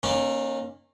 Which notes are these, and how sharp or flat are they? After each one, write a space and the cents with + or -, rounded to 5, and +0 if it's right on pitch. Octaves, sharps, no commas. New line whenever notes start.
D#3 -45 A#3 +10 C#4 -30